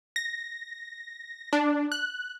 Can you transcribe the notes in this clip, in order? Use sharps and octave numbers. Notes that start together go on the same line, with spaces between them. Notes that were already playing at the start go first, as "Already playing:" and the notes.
A#6
D4
F#6